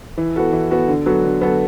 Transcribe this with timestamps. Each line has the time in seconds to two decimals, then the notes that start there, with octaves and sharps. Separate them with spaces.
0.18 E3
0.36 B3 F#4 A4
0.53 E3
0.70 B3 F#4 A4
0.88 D3
1.06 F#3 B3 F#4 A4
1.24 D3
1.41 F#3 B3 F#4 A4